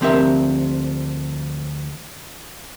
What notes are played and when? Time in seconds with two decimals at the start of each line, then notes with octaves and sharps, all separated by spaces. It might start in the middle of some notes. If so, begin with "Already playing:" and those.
0.01 D2 F3 C4 G4 A#4 E5